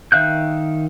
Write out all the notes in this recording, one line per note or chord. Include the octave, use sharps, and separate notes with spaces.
D#3 E5 F5 F#6 G6